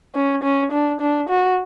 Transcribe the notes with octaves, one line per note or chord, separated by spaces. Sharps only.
C#4
C#4
D4
D4
F#4